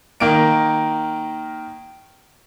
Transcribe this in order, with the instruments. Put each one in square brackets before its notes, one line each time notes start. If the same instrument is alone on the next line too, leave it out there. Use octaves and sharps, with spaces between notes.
[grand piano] D#3 A#3 D7